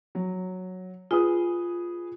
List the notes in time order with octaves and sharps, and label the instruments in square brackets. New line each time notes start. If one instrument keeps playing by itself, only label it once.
[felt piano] F#3
[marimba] F4 [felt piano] G#4 B4 D#6